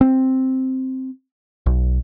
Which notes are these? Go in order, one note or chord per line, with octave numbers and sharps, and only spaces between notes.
C4
B1